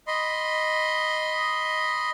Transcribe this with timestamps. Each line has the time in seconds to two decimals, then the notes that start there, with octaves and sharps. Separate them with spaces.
0.07 D#5 B5 C6